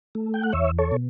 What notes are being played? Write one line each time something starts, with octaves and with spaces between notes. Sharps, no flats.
A3
G5
F#5
E2 C#5 E5
A4 C#5
B2